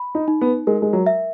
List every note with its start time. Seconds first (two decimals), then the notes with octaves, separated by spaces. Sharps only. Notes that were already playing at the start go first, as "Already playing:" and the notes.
Already playing: B5
0.15 D#4
0.28 D#4
0.41 B3
0.67 G#3 A#4
0.82 G#3
0.93 F#3
1.06 E5